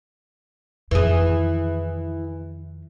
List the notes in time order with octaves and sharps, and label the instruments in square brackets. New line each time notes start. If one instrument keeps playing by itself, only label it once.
[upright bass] F2 D#3 [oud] E3 G#4